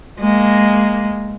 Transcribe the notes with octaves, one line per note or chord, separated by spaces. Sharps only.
G#3 A#3